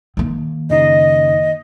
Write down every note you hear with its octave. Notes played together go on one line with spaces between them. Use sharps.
D#3 A#3
F#2 C#3 D#4 D#5